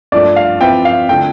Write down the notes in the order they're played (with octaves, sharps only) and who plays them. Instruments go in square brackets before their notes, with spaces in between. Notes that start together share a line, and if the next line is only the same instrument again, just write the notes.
[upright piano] G2 F3 A3 [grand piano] D5
[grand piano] F5
[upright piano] F3 C4 E4 B4 E5 [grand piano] G5
[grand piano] F5
[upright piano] D3 F3 A3 [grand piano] G5